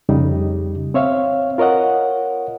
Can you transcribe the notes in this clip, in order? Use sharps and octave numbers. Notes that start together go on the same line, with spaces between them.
F2 C#3 G3 D#4
C4 C#5 E5 F5
F4 A#4 C#5 D#5 F#5